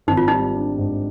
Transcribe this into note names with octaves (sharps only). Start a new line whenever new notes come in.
G#1 D#4
F4
G3 D#4
D4
G#2